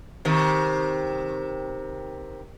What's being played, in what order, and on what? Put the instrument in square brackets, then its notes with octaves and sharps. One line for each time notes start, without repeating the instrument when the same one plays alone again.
[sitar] C3 D#3